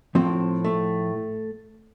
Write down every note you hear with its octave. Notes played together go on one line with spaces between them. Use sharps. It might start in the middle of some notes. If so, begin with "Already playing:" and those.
A2 F3 C4
A3